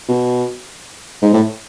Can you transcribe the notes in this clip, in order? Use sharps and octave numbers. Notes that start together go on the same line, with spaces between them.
B2
G#2
A2